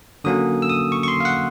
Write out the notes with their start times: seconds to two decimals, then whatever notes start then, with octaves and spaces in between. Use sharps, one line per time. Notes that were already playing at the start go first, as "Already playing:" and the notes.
0.24 D3 F#3 A#3 C#4 D#6
0.62 E6
0.69 D#6
0.92 C#6
1.03 C#6
1.08 C6
1.20 F5
1.25 F#5